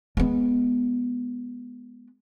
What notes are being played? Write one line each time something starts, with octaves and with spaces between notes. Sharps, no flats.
G#3 B3